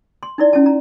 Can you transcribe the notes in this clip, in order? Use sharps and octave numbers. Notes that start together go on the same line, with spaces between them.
C6
D#4 E4 D5
C#4 E4 A5
A#5